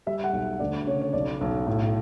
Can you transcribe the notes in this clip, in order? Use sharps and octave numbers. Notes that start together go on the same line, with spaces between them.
G3 E5
F#5
B1
D2 D5
C#3 C#5
C#5
B1 D5
B1
A2